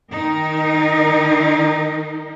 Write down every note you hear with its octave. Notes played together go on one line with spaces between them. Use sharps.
D#3 D#4 A#4